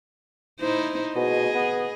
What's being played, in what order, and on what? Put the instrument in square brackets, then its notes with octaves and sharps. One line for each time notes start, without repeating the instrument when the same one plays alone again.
[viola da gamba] D#4 E4 C5
[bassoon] B2 [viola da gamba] G#4 D#5
[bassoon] B3